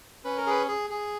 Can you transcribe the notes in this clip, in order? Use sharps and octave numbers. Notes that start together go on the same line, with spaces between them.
C#4 B4
A#4
G#4 B4
G#4
G#4